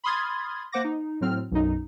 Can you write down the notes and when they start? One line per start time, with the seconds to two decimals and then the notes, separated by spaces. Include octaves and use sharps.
0.04 B5 C6 D#6 F6 G#6 A6
0.72 A#3 C5 F#5 D6 A#6
0.84 D#4
1.21 A2 F#3 C4 F6
1.51 B1 F#2 D#4